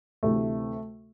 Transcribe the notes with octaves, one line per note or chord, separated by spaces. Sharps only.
D2 C3 E3 A3